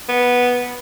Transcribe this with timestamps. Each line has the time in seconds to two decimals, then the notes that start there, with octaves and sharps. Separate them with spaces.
0.09 B3